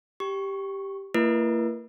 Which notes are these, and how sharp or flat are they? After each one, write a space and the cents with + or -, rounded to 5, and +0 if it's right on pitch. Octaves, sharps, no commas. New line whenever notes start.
G4 +0 C#6 +0
A#3 -40 E4 +40 B4 -40